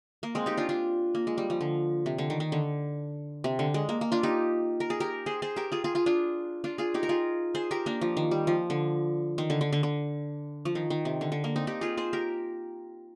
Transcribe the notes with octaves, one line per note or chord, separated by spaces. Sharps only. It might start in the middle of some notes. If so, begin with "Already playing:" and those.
A#3
G#3 C4
D#4 G4
D4 F4
D4 F4
A#3
G#3
G3
F3
D3
C3
D3
D#3
D#3
D3
C3
D3
G#3
A#3
A#3
D4 F4
D#4 G4
A#4
G#4
G4 A#4
G#4 C5
G#4 C5
G4 A#4
F4 G#4
F4 G#4
F4 G#4
D4 F4
D4 F4
F4 G#4
D#4 G4
A#4
F4 G#4
G#4 C5
G4 A#4
A#3 D4
F3
D#3
G3
F3
D3
D#3
D3
D3
D3
D3
F3
D#3
D#3
C3
D3
D3
A#3
C4 D#4
D#4 G4
F4 G#4
G#4 C5
G4 A#4